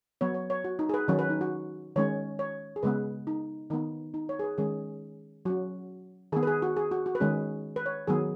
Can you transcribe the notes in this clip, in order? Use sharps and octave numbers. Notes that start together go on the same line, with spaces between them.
F#3 B3 C#5
C#5
C#5
F#4
D#4
G#4
B4
D#3 F#3 C#4
B4
D#4
F#4
D#3 G#3 C#4 C#5
C#5
G#4
C#3 G#3 B3 B4
D#4
D#3 B3 D#4
D#4
C#5
G#4
B4
D#3 G#3 C#4 G#4
F#3 C#4 F#4
D#3 B3 G#4
B4
G#4
F#4
G#4
F#4
F#4
B4
D#3 G#3 C#4 G#4
B4
C#5
D#3 F#3 B3 G#4